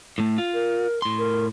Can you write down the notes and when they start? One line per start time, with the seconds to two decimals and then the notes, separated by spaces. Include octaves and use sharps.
0.18 A2 A3
0.38 F4
0.54 A#4
1.02 A2 C6
1.19 A#4